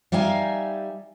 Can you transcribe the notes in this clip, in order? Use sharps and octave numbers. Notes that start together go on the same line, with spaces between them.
G3 D#4 E5 F5 G#5